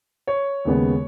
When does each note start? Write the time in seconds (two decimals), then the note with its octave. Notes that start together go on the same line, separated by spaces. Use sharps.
0.27 C#5
0.65 D#2 C#3 G#3 B3